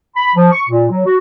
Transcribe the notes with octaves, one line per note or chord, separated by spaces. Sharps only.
B5
F3
C#6
A#2
F#3
F#4